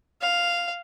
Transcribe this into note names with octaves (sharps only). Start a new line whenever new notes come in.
F5